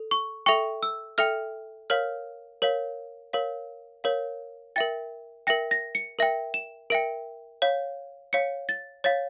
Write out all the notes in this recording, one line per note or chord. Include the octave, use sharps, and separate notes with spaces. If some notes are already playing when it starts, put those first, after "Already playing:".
Already playing: A4
C#6
A4 E5 G5 C#6
E6
A4 E5 G5 F6
A#4 C#5 F5 F6
A#4 C#5 F5
A#4 C#5 F5
A#4 C#5 F5
A#4 E5 G5 A6
A#4 E5 G5 A#6
A#6
C#7
A#4 E5 G5
E7
A#4 E5 G5 D7
C#5 F5
C#5 F5 C#7
A6
C#5 F5 A6